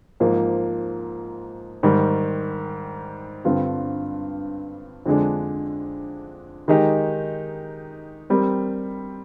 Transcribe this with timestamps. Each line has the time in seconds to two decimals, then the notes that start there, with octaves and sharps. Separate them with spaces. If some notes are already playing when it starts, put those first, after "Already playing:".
0.20 G#2 F3 A#3
1.83 G#2 D#3 G3
3.45 G2 D3 G3 C4 F4
5.06 F2 D3 G#3 D4
6.68 D#3 G#3 D#4 G4
8.30 G3 C4 G4 A#4